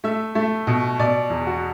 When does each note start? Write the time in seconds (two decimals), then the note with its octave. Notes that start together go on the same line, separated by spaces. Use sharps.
0.04 A3 E5
0.35 A3
0.67 B2
0.99 B2 D5
1.30 E2
1.47 F#4